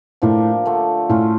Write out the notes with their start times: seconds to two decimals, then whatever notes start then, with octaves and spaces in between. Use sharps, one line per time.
0.22 A2 F3 A#3 D4 G4
0.65 D3 F3 A3 D4
1.09 A2 A3 C#4 F4